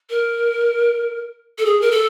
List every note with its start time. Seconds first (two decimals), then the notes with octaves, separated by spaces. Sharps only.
0.10 A#4
1.58 A4
1.66 G#4
1.81 A#4
1.91 A4